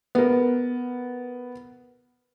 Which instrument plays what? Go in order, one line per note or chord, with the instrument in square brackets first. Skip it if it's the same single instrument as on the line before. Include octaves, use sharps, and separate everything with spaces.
[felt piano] B3 A#4